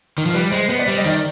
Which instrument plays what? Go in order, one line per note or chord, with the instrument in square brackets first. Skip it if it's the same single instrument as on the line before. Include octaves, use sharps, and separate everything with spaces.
[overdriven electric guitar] D#3
F3
[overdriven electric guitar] G3 [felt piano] B4
[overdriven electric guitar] G#3 [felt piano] C5
[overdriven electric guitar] B3 [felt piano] C5
[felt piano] D5
[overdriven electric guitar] G3
[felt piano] D#5
[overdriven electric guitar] D#3 [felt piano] D5